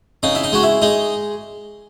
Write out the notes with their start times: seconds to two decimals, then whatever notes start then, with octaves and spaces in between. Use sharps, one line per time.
0.23 C#3 D#4
0.35 E4
0.44 D#4
0.52 G#3 F#4
0.63 E4
0.82 G#3 D#4